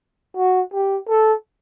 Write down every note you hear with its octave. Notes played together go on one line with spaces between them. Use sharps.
F#4
G4
A4